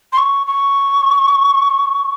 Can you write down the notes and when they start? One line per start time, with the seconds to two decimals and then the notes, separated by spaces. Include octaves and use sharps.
0.12 C6
0.17 C#6
0.47 C#6